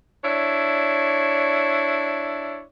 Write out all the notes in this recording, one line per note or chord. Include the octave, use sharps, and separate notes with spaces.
D4 E4 C#5 D5